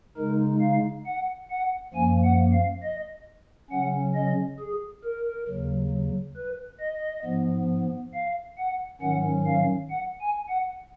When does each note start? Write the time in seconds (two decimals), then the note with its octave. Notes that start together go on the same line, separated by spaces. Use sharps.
0.17 C#3 G#3 D#4 A#4
0.61 F5
1.06 F#5
1.50 F#5
1.94 F#2 F3 A#3 G#5
2.24 F#5
2.52 F5
2.83 D#5
3.70 C#3 F#3 C#4 F#5
4.15 D#5
4.60 G#4
5.04 A#4
5.48 D#2 C#3 F#3
6.36 B4
6.80 D#5
7.25 G#2 F3 B3
8.14 F5
8.58 F#5
9.01 G#2 D#3 F#3 C#4 F#5
9.46 F5
9.90 F#5
10.21 G#5
10.49 F#5